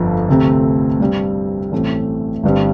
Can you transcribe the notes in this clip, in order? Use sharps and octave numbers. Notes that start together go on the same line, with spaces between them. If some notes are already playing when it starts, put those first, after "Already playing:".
Already playing: G1 F2 D3 F3
D2 C3 A3 C4
G2 G3 C4
A1 A2 A3 C4
G1 G2 G3 C4